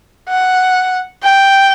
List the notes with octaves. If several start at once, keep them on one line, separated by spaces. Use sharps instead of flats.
F#5
G5